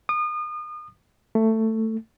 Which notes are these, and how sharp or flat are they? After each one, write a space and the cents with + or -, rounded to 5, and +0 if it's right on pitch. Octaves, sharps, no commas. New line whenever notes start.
D#6 -35
A3 +15